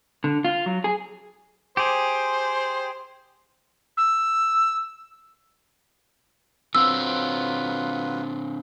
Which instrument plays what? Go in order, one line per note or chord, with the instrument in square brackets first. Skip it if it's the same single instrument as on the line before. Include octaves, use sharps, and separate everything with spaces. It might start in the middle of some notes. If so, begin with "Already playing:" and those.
[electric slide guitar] D3
F4
F#3
G#4
[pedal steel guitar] G4 G#4 [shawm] C5
[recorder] E6
[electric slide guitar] D3 C4 C5 [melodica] F#3 F4 B4 [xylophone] E6